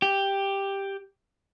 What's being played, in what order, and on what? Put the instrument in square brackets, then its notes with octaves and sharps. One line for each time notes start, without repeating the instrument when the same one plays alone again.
[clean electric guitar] G4